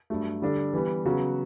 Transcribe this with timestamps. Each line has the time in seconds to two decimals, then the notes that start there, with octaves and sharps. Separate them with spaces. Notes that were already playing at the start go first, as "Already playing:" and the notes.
0.10 G2 F#3 A3
0.42 D3 G3 D4 A4
0.74 E3 G3 B3
1.05 C#3 F#3 B3 F#4